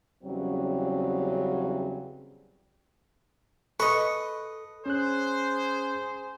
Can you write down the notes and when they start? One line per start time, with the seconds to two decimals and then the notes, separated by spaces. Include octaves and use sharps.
0.23 E2 C#3 F#3 G3 C4 C#4
3.80 A4 B4 D#5 C#6
4.86 C#4 G#4 C5 F#6